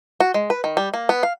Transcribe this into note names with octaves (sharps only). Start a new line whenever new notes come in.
F#4
G#3
B4
D#3
G3
A#3
B3
F5